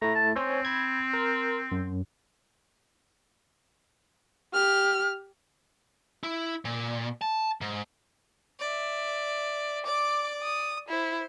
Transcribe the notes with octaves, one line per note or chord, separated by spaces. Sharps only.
A3 E4 A#5
A5
C4 C5 C#5 G#5
B5 G#6
A#4
F#2
G4 F6
E4
A#2
A5
G#2
D5 E5
D5 D6
D#6
E4 C5